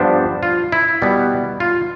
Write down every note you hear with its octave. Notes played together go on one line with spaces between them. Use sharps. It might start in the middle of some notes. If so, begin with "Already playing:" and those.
Already playing: G2 F3 B3 D4 C5
F4
E4
B2 G3 B3
F4